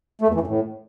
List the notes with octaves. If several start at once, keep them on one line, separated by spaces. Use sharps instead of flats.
A3
E2
E3
F#2
A2